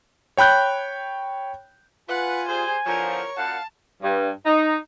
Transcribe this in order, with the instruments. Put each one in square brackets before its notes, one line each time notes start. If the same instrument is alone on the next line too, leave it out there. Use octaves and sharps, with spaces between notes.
[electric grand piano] C#5 G5 B5 F#6 G6
[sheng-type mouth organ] F4 [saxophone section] B4 [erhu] F#5 [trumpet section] G#5
[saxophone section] G3 G#4 [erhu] C5
[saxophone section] E2 D3 F3 [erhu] A#4 [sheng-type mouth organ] C#5 C#6
[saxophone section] F#2 A#2 F#5 [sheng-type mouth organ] F5 [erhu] A5
[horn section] G2
D#4